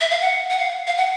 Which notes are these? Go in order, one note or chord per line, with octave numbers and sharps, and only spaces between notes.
E5
F5
F#5
F#5
F5
F5
F#5